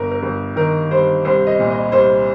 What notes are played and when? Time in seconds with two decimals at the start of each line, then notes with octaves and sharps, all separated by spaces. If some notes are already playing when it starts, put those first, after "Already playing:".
Already playing: G1 A#4
0.11 A#4
0.23 G1
0.56 D#3 A#4
0.91 G2 C5
1.25 C2 C5
1.47 D#5
1.59 A#2
1.70 D#5
1.92 C2 C5